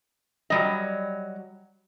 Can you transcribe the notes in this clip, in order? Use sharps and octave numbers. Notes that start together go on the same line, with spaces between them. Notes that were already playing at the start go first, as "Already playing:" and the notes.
F#3 G3 D#5